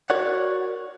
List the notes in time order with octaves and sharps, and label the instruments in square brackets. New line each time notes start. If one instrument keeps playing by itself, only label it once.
[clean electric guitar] F#4 A#4 C#5 D5 F#5